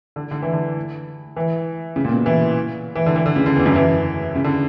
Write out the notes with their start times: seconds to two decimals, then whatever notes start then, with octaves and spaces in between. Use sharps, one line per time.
0.16 D3
0.31 D3
0.42 E3
0.53 D3
1.36 E3
1.96 C#3
2.05 A#2
2.12 B2
2.26 E3
2.95 E3
3.06 D3
3.16 E3
3.26 D3
3.36 C#3
3.46 D3
3.56 E2
3.66 F#2
3.76 E3
4.35 C#3
4.44 D3